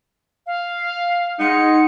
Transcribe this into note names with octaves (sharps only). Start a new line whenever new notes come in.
F5
G#3 D#4 F#5 C6 C#7